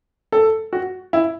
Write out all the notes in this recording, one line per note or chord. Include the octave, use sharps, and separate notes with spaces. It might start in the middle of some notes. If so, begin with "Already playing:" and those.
A4
F#4
E4